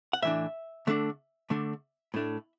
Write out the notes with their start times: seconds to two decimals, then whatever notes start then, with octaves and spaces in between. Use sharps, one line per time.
0.13 F#5
0.22 A2 E3 D4 E5
0.87 D3 A3 D4
1.50 D3 A3 D4
2.14 A2 A3 D4